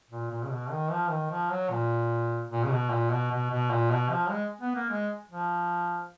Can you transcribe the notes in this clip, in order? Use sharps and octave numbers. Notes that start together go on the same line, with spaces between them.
A#2
A#2
C#3
B2
D#3
F3
D#3
F3
F#3
A#2
A#2
C#3
B2
A#2
B2
B2
B2
A#2
B2
F3
G#3
B3
A#3
G#3
F3